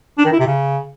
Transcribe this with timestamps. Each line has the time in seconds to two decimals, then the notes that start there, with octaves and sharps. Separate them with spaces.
0.18 D4
0.25 D#3
0.32 E4
0.39 C3
0.47 C#3